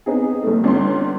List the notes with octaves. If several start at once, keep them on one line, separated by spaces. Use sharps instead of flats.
B3 C4 D#4 G#4
F#1 A3
G1 C#4 D4 C6